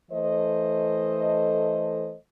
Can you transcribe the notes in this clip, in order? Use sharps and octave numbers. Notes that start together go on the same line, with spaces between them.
E3 A3 A4 C5 D#5